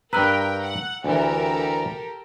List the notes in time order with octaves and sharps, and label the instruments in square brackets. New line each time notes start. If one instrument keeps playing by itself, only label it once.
[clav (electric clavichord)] G2 B4 [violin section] A#4 G5 [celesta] A#5 E6 F#6
[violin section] F#5
[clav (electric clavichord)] D2 E3 [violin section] G4 A4 A#4